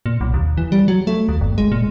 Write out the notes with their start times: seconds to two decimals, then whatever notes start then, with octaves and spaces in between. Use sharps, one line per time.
0.06 A#2
0.21 B1
0.34 D#2
0.57 E3
0.72 G3
0.88 F#3
1.07 A3
1.29 D#2
1.41 G1
1.58 G#3
1.72 A#2